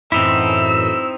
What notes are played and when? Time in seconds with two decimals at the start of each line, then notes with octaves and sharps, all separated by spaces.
0.12 F#2 A2 E3 C4 D#4 E4 E6